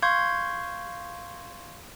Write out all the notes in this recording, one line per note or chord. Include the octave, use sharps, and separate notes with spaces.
F5 C6 C#6 G6 G#6